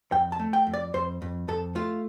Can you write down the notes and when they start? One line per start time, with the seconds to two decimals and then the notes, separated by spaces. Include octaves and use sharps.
0.12 F2 G5
0.32 A5
0.39 A3
0.53 G5
0.67 F2
0.74 D5
0.94 F2 C5
1.22 F2
1.48 F2 A4
1.75 A3 F4